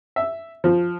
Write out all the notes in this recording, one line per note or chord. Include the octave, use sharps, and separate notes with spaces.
E5
F3